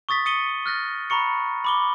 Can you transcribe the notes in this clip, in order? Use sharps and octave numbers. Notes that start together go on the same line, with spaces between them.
C#6 D#6 A6 B6
D#6 C#7 D#7 G7
F6 F#6 A6 A#6
A#5 B5 C#6 C#7
B5 D6 G7